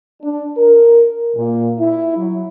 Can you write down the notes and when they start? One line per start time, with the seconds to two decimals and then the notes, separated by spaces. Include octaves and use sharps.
0.22 D4
0.56 A#4
1.36 A#2
1.79 E4
2.17 F#3